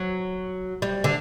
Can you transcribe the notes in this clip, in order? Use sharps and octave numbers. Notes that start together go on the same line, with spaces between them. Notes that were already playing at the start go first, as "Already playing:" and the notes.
Already playing: F#3
G3
D3